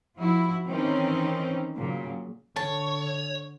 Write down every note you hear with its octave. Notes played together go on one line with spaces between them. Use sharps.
F3 E4 F#4
D#3 E3 C4 C#4 D#4
A#2 C#3 F#3
D3 C#5 A5